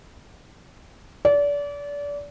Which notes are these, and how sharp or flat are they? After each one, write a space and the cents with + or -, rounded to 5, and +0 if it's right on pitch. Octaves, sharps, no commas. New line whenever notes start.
D5 -30